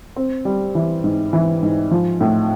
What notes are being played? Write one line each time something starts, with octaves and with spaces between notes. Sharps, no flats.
C4
G3
E3
G#2
E3
G#2
F3
A2